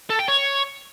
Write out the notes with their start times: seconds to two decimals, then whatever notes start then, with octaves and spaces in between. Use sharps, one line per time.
0.10 A4
0.19 G5
0.28 C#5